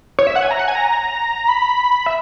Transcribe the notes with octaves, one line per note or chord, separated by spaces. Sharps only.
C#5
E5
F#5
G#5
A#5
F#5
G#5
A#5
B5
E5